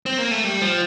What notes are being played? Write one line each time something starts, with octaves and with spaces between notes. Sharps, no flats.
C4
A#3
A3
G3
F3